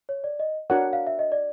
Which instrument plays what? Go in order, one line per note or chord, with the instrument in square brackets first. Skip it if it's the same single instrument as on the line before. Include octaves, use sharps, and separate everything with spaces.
[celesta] C#5
D5
D#5
[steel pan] D4 F#4 A#4 C#5 F#5
[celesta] F5
E5
D#5
D5